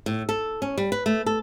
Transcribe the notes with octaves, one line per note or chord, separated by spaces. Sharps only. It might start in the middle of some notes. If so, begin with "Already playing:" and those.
A2
A4
C#4
G3
B4
A3
A4